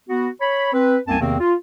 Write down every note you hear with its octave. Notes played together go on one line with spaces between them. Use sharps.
B3 F#4
C#5 B5
C4 B4
C2 F#2 A#3 C4 G#5 A5
E2 C3 D#3 A#3 C4
F4